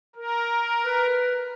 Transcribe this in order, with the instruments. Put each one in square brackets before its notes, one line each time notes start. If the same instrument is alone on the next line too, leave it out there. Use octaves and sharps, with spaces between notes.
[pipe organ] A#4
[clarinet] B4